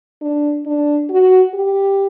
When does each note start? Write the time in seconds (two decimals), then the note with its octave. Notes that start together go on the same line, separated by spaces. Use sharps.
0.21 D4
0.66 D4
1.10 F#4
1.54 G4